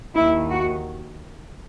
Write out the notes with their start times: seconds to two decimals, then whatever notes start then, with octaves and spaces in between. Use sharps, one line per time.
0.15 D#2 D#3 E4
0.51 F#4